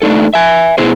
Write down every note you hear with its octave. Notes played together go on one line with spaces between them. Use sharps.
A3 D4 D#4 A4
E5 G#5
B2 B3 E4 G#4 C5